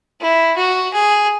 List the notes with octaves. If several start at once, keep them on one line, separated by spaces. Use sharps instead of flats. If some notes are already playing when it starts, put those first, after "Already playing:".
E4
F#4
G#4